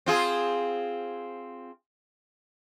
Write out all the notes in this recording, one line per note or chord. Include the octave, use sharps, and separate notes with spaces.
C4 F4 G#4